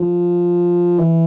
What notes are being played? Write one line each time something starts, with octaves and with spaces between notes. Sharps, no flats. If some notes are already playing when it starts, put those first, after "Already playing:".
Already playing: F3
E3